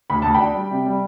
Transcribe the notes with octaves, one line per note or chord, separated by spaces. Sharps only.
D2 B5
D2 A5
G5 B5
D4
G3
C3
G3